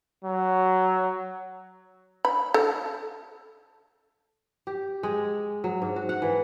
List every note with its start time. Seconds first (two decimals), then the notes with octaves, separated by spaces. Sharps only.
0.24 F#3
2.25 B5
2.54 A4
4.67 G4
5.03 G#3
5.64 F#3
5.82 G#2
5.96 F#4
6.09 F#5
6.22 E3